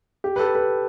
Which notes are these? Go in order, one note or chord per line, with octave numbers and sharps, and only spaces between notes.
G4
B4
A4
B4